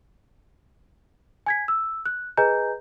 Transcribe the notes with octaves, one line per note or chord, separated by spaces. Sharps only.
G#5 G#6 B6
E6
F#6
G#4 B4 D#5 G#5 A#5 G6